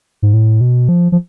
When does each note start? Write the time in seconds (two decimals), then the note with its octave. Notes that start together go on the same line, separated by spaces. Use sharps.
0.22 G#2
0.33 A2
0.61 B2
0.89 F3
1.12 F3